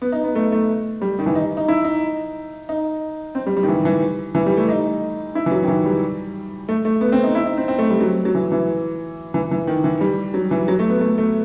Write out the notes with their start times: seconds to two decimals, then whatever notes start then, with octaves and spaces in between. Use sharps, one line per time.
0.02 B3
0.12 D#4
0.24 B3
0.35 A3
0.52 A3
1.02 G3
1.19 D#3
1.26 E3
1.35 D#4
1.57 D#4
1.68 E4
1.84 D#4
2.69 D#4
3.35 C4
3.46 G3
3.57 G3
3.63 D#3
3.68 E3
3.85 E3
4.35 E3
4.46 G3
4.57 A3
4.69 D#4
5.35 E4
5.46 E3
5.51 F#3
5.64 D#3
5.68 E3
5.85 G3
6.69 A3
6.85 A3
7.01 B3
7.12 C4
7.24 D#4
7.35 E4
7.46 D#4
7.57 C4
7.68 C4
7.79 A3
7.90 G3
8.01 F#3
8.25 F#3
8.35 E3
8.52 E3
9.34 E3
9.51 E3
9.67 D#3
9.84 E3
10.01 G3
10.34 F#3
10.51 E3
10.68 F#3
10.79 A3
10.90 B3
11.01 A3
11.18 A3